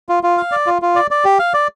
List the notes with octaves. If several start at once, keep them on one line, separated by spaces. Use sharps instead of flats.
F4
F4
F5
D5
F4
F4
D5
D5
G4
F5
D5